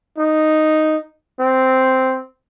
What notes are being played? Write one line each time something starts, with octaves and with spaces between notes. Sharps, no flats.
D#4
C4